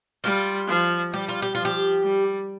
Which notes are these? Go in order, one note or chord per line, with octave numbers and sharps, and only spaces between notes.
G3 F4
F3
G3 G4
F4
G4
F3 F4
G4
G3